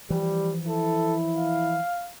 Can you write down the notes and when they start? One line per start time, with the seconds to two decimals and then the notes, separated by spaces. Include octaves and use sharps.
0.10 E3 F3 G3 G4
0.67 E4 A4
1.36 F5